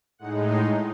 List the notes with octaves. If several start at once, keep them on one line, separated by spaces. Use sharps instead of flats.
A2 G#3 D#4 F#5
C6